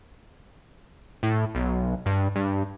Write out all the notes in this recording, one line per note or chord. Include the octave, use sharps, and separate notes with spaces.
A2
B1
G2
G2